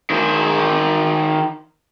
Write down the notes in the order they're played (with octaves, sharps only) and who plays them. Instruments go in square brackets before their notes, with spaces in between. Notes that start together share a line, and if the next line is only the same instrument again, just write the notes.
[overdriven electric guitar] D#3 C5